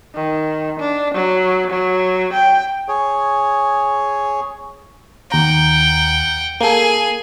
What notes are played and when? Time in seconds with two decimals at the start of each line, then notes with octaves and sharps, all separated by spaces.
0.15 D#3
0.79 D4
1.14 F#3
1.70 F#3
2.33 G5
2.88 G#4 C#5
5.32 D#2 F#5 G5 A#5
6.61 A#3 G#4 A4 G#5